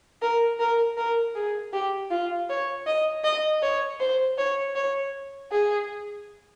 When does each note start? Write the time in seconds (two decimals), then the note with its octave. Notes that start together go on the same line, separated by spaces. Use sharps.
0.22 A#4
0.60 A#4
0.97 A#4
1.35 G#4
1.73 G4
2.11 F4
2.49 C#5
2.87 D#5
3.24 D#5
3.63 C#5
4.00 C5
4.38 C#5
4.75 C#5
5.51 G#4